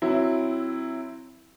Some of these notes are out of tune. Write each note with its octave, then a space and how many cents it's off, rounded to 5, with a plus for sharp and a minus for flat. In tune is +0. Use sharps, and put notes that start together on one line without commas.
F#3 +0 C4 +0 E4 +5